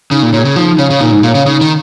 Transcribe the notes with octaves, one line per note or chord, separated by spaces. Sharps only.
C#3 D#4
A#2
A#2 C#5
G#4
C#3
F3 D#4
C#3 C#5 F5
C#3
A#2 D#4
G#2
A#2 C#5 F5
C#3
C#3 D#4
D#3